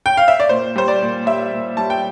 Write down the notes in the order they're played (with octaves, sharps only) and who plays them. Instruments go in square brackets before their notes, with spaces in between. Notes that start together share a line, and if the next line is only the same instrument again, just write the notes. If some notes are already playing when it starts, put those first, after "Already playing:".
[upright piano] G5
F5
E5
D5
A#2 C5
G3 C5
D5
A#2
G3 E5
A#2
G3 A5
G5